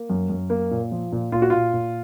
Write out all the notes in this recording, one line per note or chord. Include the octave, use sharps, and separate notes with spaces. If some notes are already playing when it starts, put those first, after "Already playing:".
Already playing: A#3
F#2
F#2
A#3
A#2
F3
A#2
A#2 F4
F#4
A#2 F4
A#2